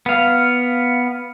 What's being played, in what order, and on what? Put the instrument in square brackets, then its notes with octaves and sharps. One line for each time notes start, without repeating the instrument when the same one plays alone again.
[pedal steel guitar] B3 F5